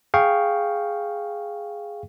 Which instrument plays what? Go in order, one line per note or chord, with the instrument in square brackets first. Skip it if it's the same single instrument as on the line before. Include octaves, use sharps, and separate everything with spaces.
[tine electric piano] G#4 F5 G5 C#6